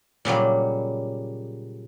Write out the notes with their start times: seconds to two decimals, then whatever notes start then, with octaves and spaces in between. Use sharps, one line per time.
0.25 A#2 C#3 F#3 G3